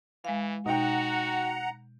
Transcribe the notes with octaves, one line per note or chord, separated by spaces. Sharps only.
E3 G#3 F5
B2 D#4 F#4 F#5 G5 A#5